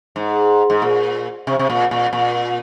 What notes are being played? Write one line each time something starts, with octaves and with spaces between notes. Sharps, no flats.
G#2
G#2
A#2
C3
C3
A#2
A#2
A#2